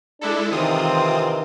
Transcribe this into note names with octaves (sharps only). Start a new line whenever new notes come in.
G#3 D4 E4 A4
C3 D#3 E3 C4 F4 D#6